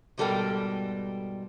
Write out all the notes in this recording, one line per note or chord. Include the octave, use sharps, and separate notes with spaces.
G#2 B2 G3 A4 A#4 G5